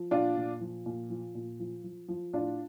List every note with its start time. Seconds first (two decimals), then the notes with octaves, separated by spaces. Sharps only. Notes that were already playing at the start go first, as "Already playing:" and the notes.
Already playing: F3
0.11 A#2 D4 F4
0.36 A#2
0.61 F3
0.86 A#2
1.10 F3
1.35 A#2
1.60 F3
1.84 F3
2.08 F3
2.33 A2 D4 F4